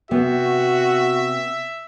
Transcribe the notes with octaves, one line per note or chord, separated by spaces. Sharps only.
C3 B3 F#4 E5